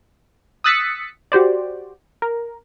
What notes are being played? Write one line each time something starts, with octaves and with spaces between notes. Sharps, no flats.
D#6 E6 F#6 A6 B6 C#7
F#4 G4 C5 D5
A#4